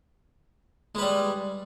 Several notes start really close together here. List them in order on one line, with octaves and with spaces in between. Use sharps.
G#3 B4 G3